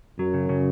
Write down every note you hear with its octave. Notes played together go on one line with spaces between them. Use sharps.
F#2 F#3
C#3
C#3